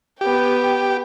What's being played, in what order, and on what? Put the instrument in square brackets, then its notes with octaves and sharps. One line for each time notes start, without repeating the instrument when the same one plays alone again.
[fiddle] B3 G5 [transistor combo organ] G4